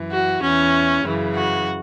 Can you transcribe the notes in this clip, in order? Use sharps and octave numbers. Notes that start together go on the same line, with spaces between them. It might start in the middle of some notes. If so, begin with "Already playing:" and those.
Already playing: F#2 E3
F#4
E2 E3 C#4
F#2 C#3 E3
F#4